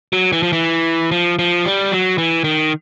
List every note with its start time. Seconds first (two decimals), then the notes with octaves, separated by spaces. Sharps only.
0.13 F#3
0.33 E3
0.43 F3
0.53 E3
1.12 F3
1.39 F3
1.66 G3
1.91 F#3
2.18 E3
2.44 D#3